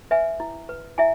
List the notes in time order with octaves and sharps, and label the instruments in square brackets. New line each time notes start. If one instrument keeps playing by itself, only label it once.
[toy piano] B4 E5 G#5
E4
B4
E4 E5 G#5